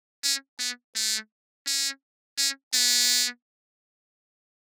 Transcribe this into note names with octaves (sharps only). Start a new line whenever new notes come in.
C#4
B3
A3
C#4
C#4
B3